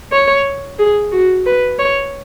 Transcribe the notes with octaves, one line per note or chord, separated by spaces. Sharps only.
C#5
G#4
F#4
B4
C#5